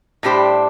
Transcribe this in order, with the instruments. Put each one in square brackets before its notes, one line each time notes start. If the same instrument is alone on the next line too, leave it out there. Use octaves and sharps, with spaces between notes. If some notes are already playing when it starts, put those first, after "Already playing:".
[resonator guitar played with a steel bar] A2 G3 D4 G4 C5